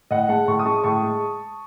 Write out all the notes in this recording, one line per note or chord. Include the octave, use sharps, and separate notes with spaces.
A2 D#5 F#5
G#3 F#5 A5
A2 A5 C#6
D#6
G#3 A5 C#6
A2 A5 C#6
G#3